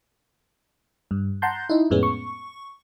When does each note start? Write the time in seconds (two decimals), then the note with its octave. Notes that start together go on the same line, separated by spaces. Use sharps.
1.11 G2
1.42 F#5 A5 A#5 C6 G6
1.69 D#4 E4
1.90 F2 A2 G#3 B3 C#4
2.03 C#6